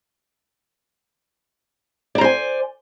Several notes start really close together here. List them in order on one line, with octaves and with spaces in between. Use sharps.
D5 A#5 C5 G#5